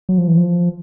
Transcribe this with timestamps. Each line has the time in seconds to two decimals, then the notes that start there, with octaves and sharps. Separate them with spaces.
0.09 F#3
0.18 F3
0.28 E3
0.37 F3